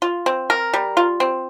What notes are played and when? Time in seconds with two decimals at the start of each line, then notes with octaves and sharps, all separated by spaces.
0.02 F4
0.26 C4
0.50 A#4
0.74 G3
0.97 F4
1.20 C4